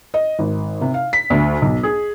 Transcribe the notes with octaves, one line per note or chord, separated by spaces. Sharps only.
D#5
G#1
C3
F5
B6
D2
B1
G#4